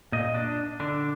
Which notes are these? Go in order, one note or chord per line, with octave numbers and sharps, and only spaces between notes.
A#2 D#5
D4
D3 D4